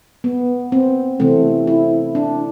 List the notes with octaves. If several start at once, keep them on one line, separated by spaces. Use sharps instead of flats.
B3
C4
C3 E3 A3 C4
E4
D4